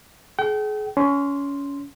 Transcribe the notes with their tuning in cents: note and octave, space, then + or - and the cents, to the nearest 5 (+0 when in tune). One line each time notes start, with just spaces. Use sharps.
G#4 +35 G5 -35
C#4 +25 C6 +0